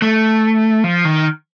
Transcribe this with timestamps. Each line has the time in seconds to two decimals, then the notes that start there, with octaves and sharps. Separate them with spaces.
0.02 A3
0.84 F3
1.05 D#3